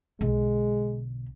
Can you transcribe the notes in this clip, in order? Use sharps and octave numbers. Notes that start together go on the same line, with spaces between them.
B1 D3 G#3